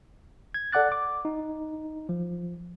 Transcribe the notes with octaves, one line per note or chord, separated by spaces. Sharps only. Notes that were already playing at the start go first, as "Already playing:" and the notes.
G#6
A4 D5 F#5 D6 F#6 A6
D6
D#4
F3